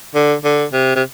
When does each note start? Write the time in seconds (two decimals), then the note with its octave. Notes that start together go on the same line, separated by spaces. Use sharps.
0.14 D3
0.44 D3
0.73 C3
0.96 C3